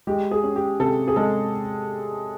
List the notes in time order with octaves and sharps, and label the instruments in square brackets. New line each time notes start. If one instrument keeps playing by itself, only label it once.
[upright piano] G#3 G4
G#4
C#4
G4
C3 A4
G#4
G#3 A4